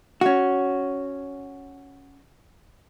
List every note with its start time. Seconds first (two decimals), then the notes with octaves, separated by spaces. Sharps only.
0.21 C#4 F#4